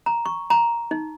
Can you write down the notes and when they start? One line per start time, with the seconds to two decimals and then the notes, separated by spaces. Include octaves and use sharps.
0.06 A#5
0.26 C#6
0.50 A#5
0.91 D#4